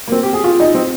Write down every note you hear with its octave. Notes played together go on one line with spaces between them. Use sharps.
A#3
C4
G4
G#4
F4
D#4
C4